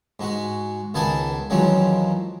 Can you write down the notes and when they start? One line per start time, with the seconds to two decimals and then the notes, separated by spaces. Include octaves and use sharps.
0.20 G#2 G#3 F#4
0.94 C#2 D#3 B3 G#4 G#5 A5
1.50 E2 D#3 F3 F#3 G#3 C#4